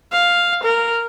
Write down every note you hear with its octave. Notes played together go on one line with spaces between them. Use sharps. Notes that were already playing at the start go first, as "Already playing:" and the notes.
F5
A#4